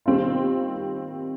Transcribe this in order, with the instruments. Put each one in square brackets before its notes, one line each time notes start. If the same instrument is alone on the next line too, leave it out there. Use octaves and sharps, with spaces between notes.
[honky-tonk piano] D#3 G3 C4 F4